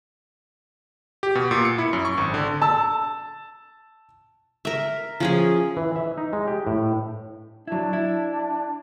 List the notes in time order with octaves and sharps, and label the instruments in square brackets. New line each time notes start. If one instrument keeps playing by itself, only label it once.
[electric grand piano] G4
B2
A#2
C#7
E4
F#2
C#6
G#1
D3
[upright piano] A5 E6
[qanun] A#4 E5
F3 C#4 G#4
[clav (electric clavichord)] E3
E5
D#4
G#3
G4
A2
[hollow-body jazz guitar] F#3 E4 [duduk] D4
[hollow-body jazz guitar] E4